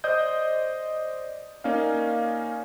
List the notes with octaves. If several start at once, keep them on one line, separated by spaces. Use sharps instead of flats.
C5 D5 D#5 D#6 G6
A#3 C#4 D#4 D5 F5